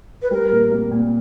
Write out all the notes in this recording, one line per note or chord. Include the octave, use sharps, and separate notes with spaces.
B4
G3 A#4
A#2
A#3
A#2